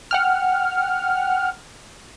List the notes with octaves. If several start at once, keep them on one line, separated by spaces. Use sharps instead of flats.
F#5 G5 F6